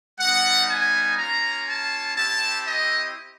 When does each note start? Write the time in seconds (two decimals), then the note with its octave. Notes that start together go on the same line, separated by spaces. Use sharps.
0.20 G3 B3 D#4 F#5
0.68 G#5
1.18 A#3 C#4 F4 A#5
1.67 A5
2.15 C4 E4 G4 A5
2.65 D#5